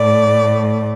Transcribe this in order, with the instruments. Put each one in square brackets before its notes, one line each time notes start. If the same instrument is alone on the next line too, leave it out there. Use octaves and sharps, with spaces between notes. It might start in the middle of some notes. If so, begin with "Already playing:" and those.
Already playing: [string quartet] A2 A3 D5